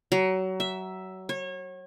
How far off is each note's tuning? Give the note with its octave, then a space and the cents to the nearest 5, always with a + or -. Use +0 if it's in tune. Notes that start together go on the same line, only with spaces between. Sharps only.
F#3 +25
E5 +0
C#5 -30